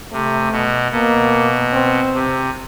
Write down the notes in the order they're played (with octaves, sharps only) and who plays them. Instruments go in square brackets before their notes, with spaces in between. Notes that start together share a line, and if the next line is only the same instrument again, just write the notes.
[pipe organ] C3 [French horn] A3
[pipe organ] B2
[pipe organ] B2 [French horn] A#3
[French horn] C4
[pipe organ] C3